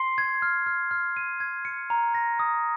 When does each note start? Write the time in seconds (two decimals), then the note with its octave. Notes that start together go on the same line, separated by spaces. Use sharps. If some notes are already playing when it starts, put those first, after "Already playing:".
Already playing: C6 C7
0.18 G#6
0.42 F6
0.66 F6
0.91 F6
1.17 D#7
1.40 G#6
1.65 C#7
1.90 A#5
2.15 A#6
2.39 D#6